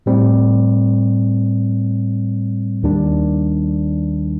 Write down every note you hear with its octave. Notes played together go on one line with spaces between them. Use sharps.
A2 G3 C4
D#2 D#3 G3 D4